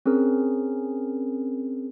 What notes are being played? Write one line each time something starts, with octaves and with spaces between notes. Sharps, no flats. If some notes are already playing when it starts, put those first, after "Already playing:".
C4 C#4 G#4 A#4